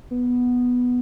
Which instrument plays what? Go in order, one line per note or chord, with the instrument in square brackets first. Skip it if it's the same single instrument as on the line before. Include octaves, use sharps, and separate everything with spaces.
[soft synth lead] B3